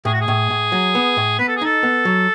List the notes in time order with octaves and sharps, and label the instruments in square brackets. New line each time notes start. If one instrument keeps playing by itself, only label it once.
[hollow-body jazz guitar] A2 [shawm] G#4
[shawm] F#4
G#4
[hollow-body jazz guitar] A2
A2
F#3
B3
A2
[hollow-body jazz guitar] B3 [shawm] B4
[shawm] A4
G#4
[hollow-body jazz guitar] D#4 [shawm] A4
[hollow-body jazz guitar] B3
F#3